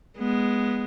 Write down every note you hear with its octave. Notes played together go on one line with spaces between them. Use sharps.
G#3 B3